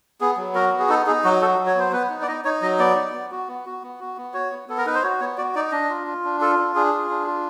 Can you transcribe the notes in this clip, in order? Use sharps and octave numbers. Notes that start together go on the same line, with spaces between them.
B3 G#4
F#3
F#4 A#4
B3
G#4
D#4 A4
D#4 G#4
F#3 F#4
F#4 A4
F#3
C#5
B3 C5
B3 B4
D#4
D5
D#4 D#5
D#4 C#5
F#3 D#5
B3 D5
D#4
B3
F#4
B3
F#4
B3
F#4
B3
F#4 C#5
B3
B3 A4
A#4
D#4 B4
C5
F#4 C#5
B3 C#5
F#4 D5
D#4 D5
D4 D#5
F4
F4
D4
F4 A4
D4
D4 G#4
F4
D4
F4